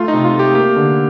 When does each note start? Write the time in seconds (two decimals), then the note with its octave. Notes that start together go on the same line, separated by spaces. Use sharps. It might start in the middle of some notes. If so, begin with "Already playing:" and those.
Already playing: A3 F4
0.08 D#4
0.14 C3
0.25 F4
0.34 A3 G4
0.55 A#3 G4
0.76 D3